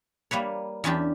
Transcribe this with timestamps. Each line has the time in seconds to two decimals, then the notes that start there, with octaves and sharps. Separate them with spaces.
0.31 G3 A#3 B4 C#5
0.84 E2 C#4 D4 G4